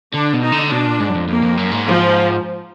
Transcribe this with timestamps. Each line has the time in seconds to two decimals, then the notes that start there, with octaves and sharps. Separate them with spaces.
0.14 D3 D4
0.33 B2
0.43 D#4
0.52 D3
0.71 B2 D4
0.86 A#2
1.00 G#2
1.09 F#2
1.15 F2
1.29 F2 A#3
1.43 F2
1.57 F#2
1.72 G#2
1.86 F3